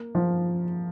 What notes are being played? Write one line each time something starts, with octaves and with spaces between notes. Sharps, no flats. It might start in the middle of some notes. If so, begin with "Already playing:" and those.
Already playing: A#3
F3